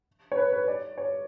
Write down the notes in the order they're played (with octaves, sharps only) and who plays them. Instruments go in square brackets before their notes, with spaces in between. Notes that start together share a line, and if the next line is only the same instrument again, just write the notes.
[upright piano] C#5
B4
B4
D5
C#5